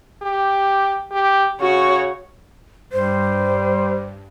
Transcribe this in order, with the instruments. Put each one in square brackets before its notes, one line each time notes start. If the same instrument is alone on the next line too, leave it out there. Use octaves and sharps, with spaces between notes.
[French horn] G4
G4
[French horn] C#3 [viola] F#4 C#5
[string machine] G2 [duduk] G3 [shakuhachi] C5